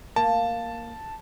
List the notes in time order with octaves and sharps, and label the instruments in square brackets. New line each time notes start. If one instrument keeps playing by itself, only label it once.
[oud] A#3 [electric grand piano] A5